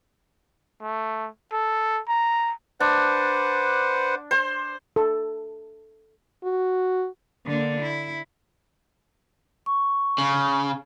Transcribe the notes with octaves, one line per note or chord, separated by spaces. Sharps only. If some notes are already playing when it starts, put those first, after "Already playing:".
A3
A4
A#5
D4 B4 C5 F#5
C5 C6
A4
F#4
D3 A#3
E4
C#6
C#3